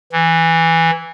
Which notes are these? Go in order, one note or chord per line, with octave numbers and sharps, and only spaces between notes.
E3